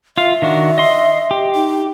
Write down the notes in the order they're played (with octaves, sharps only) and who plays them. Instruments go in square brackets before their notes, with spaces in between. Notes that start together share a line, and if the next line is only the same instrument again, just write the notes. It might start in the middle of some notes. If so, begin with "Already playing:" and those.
[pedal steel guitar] F4 F5 [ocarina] E5
[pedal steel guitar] D#3 D4 F#4
D#5 C6
G4
[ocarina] D#4